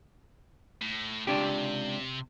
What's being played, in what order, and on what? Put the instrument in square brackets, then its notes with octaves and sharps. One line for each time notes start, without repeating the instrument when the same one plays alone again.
[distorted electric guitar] A2
[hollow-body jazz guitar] C#2 D4 G4 [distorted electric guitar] C3